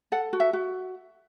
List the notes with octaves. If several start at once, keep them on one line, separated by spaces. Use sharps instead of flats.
A4 F#5
F#4
E5
F#4